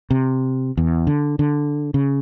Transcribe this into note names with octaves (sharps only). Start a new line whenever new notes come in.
C3
E2
D3
D3
C#3